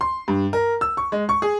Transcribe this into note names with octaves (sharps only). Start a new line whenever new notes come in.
C6
G2
A#4
E6
C#6
G#3
C#6
G#4